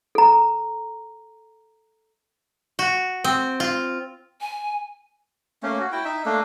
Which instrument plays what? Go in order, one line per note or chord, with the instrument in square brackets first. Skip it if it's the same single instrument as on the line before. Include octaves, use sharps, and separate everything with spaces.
[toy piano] A4 A#5
[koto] F#4
C4
F4
[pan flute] G#5
[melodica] A3 A#3 C#4
F#4
E4 G5
D#4 E5
A3 A#3 D4 A4